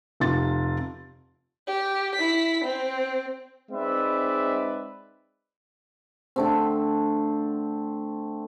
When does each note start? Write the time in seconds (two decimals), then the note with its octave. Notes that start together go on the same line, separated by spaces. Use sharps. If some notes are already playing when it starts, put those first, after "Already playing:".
0.20 F1 C3 F4 A6
1.67 G4
2.15 E4 B6
2.65 C4
3.71 G#3 C4 D#4 B4 D5 E5
6.36 D3 A3 C4